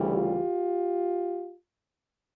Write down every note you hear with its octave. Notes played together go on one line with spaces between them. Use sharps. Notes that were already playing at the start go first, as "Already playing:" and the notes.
Already playing: D2 C#3 E3 G3
F4 G4